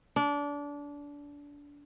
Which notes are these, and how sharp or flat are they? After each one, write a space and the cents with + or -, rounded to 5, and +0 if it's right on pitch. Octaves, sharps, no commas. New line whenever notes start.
D4 -25